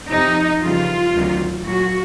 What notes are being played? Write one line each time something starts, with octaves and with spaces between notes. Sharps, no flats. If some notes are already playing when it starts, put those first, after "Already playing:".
F2 C3 F3 D#4
F2 C#3 E3 G3 F4
D2 C3 D#3 F#3
A#2 F#3 F#4